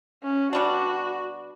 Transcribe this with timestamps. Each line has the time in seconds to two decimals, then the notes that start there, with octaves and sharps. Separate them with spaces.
0.23 C#4
0.53 B2 G3 D4 F#4